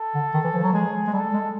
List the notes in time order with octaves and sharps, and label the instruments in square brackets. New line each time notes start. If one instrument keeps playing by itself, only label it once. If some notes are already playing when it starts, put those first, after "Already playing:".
Already playing: [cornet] A4
[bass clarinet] D3
D#3
E3
F3
F#3
[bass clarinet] G#3 [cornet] G#4
[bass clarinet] G#3
[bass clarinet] G3 [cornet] A4
[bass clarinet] G#3